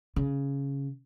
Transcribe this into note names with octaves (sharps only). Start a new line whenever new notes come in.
C#3